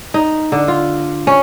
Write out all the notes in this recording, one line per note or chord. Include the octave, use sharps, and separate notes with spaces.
D#4
D3
F4
C#4